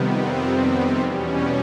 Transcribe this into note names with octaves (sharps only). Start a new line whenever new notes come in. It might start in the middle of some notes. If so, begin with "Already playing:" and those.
Already playing: F2 C3 D#3 G3 B3
C4
E2 B2 G3 C#4